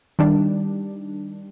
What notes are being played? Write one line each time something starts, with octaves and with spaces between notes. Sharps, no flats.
D#3 G3 D4